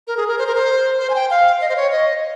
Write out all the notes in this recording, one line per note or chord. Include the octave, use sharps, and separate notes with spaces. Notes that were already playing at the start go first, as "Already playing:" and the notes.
A#4
G#4
A#4
C5
A#4
C5
C5
G#5
G5
F5
D#5
C5
C#5
D#5